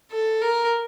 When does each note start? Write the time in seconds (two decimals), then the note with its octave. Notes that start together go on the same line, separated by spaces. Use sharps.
0.12 A4
0.41 A#4